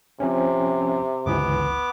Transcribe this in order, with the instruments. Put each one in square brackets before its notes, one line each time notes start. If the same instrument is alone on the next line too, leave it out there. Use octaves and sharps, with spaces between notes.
[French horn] C3 [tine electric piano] F3 C4 C#4
[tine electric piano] G1 C#2 E3 [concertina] B3 D6